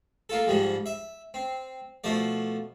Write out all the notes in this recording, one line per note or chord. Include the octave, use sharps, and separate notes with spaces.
A#3 F4 A4
G#2 F3 G3 G#3
E5
C4
B2 F3 A3 D5